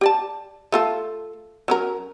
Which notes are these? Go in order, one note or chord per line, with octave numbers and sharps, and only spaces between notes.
G4 D5 A5
A3 F4 A4
F#3 C#4 A#4